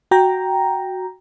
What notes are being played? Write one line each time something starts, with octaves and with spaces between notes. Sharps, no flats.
F#4 G5 A#5